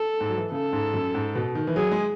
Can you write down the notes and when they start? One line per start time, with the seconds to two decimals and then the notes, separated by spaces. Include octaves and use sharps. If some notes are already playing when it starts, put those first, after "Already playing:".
Already playing: A4
0.20 G#2
0.29 F#3
0.37 E3
0.52 C#3 A4
0.73 G#2
0.94 F#2
1.15 G#2
1.35 B2
1.55 D#3
1.67 E3
1.76 F#3 G#4
1.92 G#3